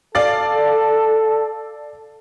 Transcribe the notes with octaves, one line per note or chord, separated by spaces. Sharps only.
A4 D5 F5 A6